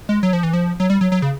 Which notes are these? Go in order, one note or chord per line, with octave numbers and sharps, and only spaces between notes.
G#3
F#3
F3
E3
F3
F#3
G3
F#3
F#3
C#3